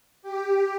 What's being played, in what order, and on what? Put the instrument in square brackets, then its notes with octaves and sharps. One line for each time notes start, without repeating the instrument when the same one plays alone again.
[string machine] G4